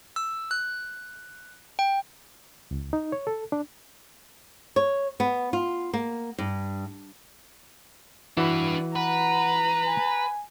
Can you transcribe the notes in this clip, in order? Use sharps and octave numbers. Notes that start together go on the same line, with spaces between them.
E6
F#6
G5
C#2
D#4
C#5
A4
D4
C#5
B3
F4
A#3
G2
E3 D4 F#4 B4
B4 F#5 A#5
G#5